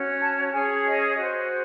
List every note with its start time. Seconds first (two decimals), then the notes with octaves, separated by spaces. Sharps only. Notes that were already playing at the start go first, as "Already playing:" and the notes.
Already playing: C#4 F#4 C#5
0.20 A5
0.52 C#4 G#4 C#5 G#5
0.85 D#5
1.16 F#4 C5